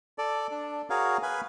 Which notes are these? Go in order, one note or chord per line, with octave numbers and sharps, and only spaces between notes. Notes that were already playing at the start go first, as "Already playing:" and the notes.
A4 D5
D4
F#4 G#4 A#4 C#5 F5
B4 F5 G#5 B5